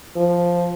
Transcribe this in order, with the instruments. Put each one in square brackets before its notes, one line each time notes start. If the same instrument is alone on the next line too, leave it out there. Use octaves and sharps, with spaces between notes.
[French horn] F3